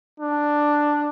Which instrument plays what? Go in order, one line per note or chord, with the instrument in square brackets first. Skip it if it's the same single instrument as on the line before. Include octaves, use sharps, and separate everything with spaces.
[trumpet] D4